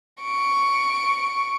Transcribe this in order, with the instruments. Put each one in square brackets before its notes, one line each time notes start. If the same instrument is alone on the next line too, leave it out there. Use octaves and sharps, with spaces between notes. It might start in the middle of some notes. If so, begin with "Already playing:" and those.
[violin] C#6 D7